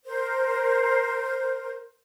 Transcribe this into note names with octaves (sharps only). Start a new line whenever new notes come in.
A#4 C5